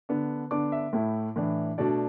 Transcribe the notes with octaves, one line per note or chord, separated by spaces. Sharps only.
D3 B3 D4
D3 B3 D4 D6
E5
A2 A3 E4
A2 E3 D4
B2 A3 D4 D5